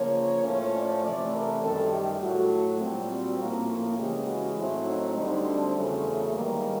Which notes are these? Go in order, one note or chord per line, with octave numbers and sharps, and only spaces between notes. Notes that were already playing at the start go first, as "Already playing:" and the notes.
Already playing: C#3 F3 A#3 C#5
A2 F3 A3 C#4
D5
C3 E3 A3 D5
A#4
F#2 D#3 G3 A4
G4
A2 F#3 A3 F#4
A#2 G3 C4
F#4
A2 F3 A#3 C#4
C#3 E3 G#3 C#4 G4
F#4
A2 F#3 A3 C4 E4
D#4
D2 D3 G3 C4
D4
E2 C#3 F#3 A3 C#4
G#2 D#3 G3 A#3